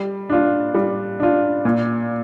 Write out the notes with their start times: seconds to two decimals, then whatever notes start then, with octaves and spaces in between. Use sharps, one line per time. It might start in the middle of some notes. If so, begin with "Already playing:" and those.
Already playing: G3
0.30 D4 F4
0.74 G3
1.20 D4 F4
1.65 A#2